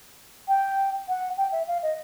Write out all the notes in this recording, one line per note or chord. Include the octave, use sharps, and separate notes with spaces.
G5
F#5
G5
E5
F5
D#5